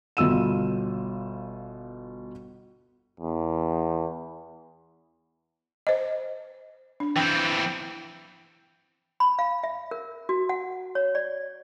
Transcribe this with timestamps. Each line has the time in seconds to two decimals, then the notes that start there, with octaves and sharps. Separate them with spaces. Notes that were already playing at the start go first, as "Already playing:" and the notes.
0.17 G1 B2 F4 E6 D#7 E7
3.20 E2
5.87 C5 D#5
7.00 D4
7.16 E3 C4 G5
9.20 B5
9.39 F5
9.64 E5
9.91 A#4
10.29 F#4
10.49 F#5
10.95 C#5
11.15 D5